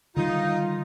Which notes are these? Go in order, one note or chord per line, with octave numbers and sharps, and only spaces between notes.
D3 D#3 G3 D#4 F4